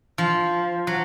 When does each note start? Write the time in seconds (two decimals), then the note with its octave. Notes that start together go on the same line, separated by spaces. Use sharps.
0.18 F3
0.87 F#3